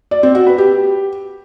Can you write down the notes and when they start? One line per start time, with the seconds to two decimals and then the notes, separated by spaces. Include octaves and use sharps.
0.11 D5
0.23 C4
0.35 F#4
0.47 B4
0.58 G4